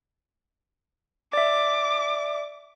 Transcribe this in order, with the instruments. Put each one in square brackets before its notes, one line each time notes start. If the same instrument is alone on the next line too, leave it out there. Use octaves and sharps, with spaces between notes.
[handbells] D5 E5 [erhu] D6